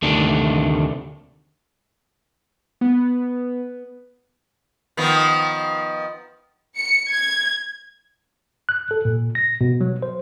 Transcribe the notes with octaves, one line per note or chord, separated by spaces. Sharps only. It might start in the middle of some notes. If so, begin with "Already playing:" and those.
D2 C3 D#3 A3 D4
B3
D#3 F3 B3
C#7
G#6
F#6
A4
A#2
A#6
B2
F#3
C5